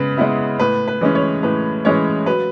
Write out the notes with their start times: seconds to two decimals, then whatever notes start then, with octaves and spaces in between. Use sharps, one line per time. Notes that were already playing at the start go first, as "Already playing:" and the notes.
Already playing: C#3 G#3 B3 B4
0.17 G#3 B3 E4
0.59 A2 B4
0.88 B4
1.01 E3 G#3 C#4
1.15 C#5
1.43 A2 B4
1.85 E3 G#3 C#4 C#5
2.26 F#3 B4